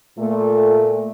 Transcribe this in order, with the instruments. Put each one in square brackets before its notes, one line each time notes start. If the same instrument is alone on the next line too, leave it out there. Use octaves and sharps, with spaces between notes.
[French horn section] A#2 A3